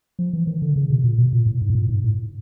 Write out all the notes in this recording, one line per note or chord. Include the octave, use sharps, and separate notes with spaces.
F3
E3
D#3
D3
C#3
B2
A#2
B2
A#2
A2
G#2
A2
A#2
G#2
A2